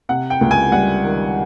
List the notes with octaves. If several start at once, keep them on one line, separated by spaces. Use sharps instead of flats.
C3 F#5
G5
C#2
G#5
G3 F#5
D#3